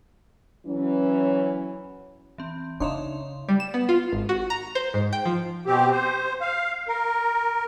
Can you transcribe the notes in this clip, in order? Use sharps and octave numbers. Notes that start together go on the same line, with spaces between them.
E3 F#3 C#4
E3 C4
C#3 D4 D#4 C#5 E5 F5 C6
G3
E7
B3
F4
G#1
F#4
A#5
C5
G#2
G5
F3
B2 C4 G4
C5
F5
A#4